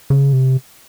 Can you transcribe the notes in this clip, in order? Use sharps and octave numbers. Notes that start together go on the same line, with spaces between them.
C#3
C3